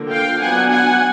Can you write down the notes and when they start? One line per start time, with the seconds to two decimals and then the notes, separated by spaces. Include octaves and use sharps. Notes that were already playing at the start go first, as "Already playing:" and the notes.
Already playing: D3 F3 A#3
0.09 F5 G5
0.39 F#3 B3 D4 F#5 G#5
0.69 F#5 G#5